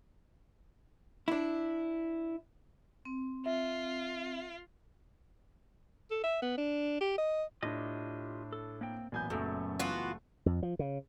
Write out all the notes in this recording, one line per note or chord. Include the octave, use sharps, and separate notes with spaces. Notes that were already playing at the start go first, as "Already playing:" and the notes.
D4 E4
C4
F4 E5
A4
E5
B3
D4
G4
D#5
A2 D4 F4 G4 D#5
A4
A#3 C4 G5
A1 A#2 F#3 B3 G#5 G6
F#1 F#2 A3 A4
E3 B3 F4 F#4
F2
F3
C#3